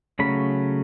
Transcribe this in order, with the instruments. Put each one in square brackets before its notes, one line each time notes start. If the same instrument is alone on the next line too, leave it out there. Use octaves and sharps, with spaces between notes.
[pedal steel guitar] C#3 F#3 A3 C#4 B5